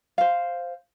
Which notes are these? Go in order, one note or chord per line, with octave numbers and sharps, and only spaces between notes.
C5 F5